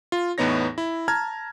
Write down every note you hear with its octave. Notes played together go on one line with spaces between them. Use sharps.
F4
E2 A2 B3 D#4 C#5 A#6
E4
A5 A#5 F6 G#6